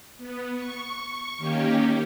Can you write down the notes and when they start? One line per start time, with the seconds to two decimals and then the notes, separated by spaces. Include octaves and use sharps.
0.17 B3
0.53 C#6
1.38 D#3 A#3 C#4 G4